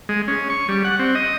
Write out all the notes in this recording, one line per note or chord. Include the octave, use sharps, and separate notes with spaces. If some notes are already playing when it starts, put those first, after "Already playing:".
G#3
C#4
C#6
G3
F#5
C4
D#5